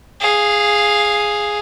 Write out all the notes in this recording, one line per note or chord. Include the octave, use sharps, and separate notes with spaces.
G#4 F5